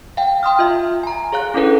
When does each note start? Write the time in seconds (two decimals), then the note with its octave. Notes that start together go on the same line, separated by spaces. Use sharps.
0.17 F5 G5
0.43 G5 C6 D#6 F6
0.59 F4 E5
1.03 G#5 A#5
1.32 G#4 C#5 F5 F#6
1.54 C#4 D4 E4 A4 B4